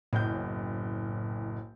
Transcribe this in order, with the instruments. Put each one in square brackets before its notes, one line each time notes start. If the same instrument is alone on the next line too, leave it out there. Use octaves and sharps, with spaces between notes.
[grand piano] F#1 B1 G6 [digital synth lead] A2